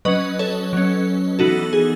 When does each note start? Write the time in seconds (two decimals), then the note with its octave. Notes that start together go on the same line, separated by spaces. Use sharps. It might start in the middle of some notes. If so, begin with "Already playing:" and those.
0.05 F#3 C#4 B4 D#5
0.39 A4 C#5
0.73 F#3 C#4
1.39 E3 B3 D#4 F#4 A4
1.73 G#4